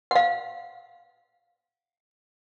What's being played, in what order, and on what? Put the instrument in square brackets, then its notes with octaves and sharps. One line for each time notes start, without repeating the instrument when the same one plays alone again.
[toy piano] F5 F#5